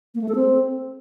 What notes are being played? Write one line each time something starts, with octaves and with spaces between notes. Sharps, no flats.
A#3
A3
A4
C4